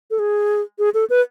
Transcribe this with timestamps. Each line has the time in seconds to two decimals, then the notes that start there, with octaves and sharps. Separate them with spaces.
0.11 A4
0.19 G#4
0.79 G#4
0.94 A4
1.10 B4